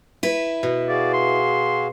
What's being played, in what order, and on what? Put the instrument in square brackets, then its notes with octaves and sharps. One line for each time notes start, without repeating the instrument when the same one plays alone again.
[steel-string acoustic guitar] E4 B4
[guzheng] B2
[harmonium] F#4 G#4 F5 [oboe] D5
[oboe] C6